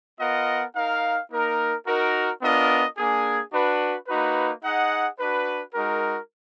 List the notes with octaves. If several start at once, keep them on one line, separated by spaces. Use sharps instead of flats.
B3 F4 A#4 D#5 F#5
D#4 A#4 F5
A#3 D#4 A#4
D#4 F#4 A#4
B3 D4 F4 A#4 D#5
A#3 D4 G#4
D4 F#4 B4
A#3 D#4 F#4 B4
D#4 G#4 D#5 F#5
D4 F#4 B4
G#3 D#4 F#4 A#4